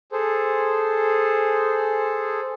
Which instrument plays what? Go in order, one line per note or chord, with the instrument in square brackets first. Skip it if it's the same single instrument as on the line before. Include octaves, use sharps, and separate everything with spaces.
[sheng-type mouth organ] G#4 A4 C5